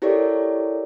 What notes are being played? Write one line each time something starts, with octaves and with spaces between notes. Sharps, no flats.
E4 G4 A4 A#4 C#5 D5